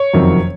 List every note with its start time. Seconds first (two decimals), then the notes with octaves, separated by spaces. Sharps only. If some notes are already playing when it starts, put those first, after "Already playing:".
Already playing: C#5
0.13 F#1 F2 C3 D#3 F#3